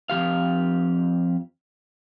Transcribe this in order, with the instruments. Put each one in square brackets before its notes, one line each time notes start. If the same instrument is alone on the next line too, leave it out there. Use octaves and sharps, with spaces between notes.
[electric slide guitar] F2 E3 G4 F5